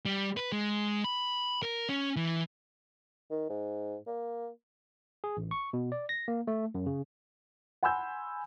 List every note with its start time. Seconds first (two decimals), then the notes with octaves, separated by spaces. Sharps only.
0.06 G3
0.37 B4
0.52 G#3
1.04 B5
1.63 A#4
1.89 C#4
2.16 E3
3.31 D#3
3.50 G#2
4.07 A#3
5.24 G#4
5.37 A1
5.51 C#6
5.73 B2
5.92 D5
6.09 A#6
6.28 A#3
6.47 A3
6.75 F#2
6.86 C#3
7.83 F#5 G#5 B5 C6 E6 G6